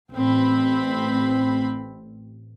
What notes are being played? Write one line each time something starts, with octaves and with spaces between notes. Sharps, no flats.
A1 C4 B5